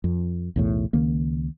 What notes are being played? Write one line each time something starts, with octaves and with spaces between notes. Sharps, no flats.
F2
B1 E2 A2
C#2 D#3 A#3